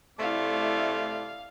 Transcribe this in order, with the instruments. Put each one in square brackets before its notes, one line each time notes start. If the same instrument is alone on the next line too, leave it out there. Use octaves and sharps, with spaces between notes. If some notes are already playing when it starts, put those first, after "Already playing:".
[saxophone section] C3 A3 [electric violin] E4 D5 [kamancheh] F5